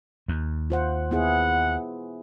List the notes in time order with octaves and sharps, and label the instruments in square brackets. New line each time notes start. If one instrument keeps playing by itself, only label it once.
[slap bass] D#2
[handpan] F4 C5 F#5
[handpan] B3 E4 G#4 [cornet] F#5